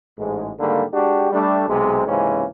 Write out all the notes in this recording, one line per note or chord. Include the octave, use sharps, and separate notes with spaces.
A1 G#2 G#3
G#2 D3 D#3 G3 A#3
G#3 D4 F#4 G4
G3 A3 D4
B1 C3 G#3
C#2 G#2 C3 E3 A#3 C#4